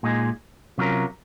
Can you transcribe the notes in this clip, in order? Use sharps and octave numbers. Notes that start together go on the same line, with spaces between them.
A#2 G#3 D#4 G#4
C3 F#3 C#4 F4 A#4